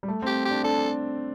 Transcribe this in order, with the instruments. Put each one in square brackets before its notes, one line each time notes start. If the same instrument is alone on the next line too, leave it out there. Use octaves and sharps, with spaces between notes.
[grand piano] G3
A3
[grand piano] C4 [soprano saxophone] G4
[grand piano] D4 [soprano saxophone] G4
[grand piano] D4 [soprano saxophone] A4